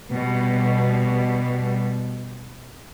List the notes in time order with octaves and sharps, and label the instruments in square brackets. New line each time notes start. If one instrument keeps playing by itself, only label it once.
[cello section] B2 G3